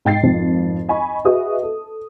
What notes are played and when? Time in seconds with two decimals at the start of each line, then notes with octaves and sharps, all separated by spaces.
0.05 G#2 G5 A6 C7
0.23 G#1 F2 F3
0.89 D#5 G#5 B5 C#6
1.25 F#4 G#4 B4 D#5 E5 D#6
1.63 A4